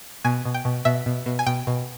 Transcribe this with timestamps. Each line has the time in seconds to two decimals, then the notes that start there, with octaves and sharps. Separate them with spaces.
0.24 B2 G#5
0.45 B2
0.54 G5
0.65 B2
0.85 B2 E5
1.06 B2
1.26 B2
1.39 G#5
1.46 B2 G5
1.67 B2